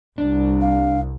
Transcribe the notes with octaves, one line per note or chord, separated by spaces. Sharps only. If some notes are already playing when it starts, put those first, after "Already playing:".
C2 D4
F5